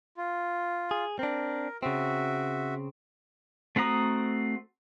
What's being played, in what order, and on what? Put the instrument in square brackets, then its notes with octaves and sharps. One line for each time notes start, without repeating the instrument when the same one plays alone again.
[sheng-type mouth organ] F4
[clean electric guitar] G#4
[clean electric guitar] C4 D4 [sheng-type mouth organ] A#4
[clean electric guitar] C#3 C4 [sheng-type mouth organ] F#4 E5
[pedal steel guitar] A3 C4 F#4 A#5 D#6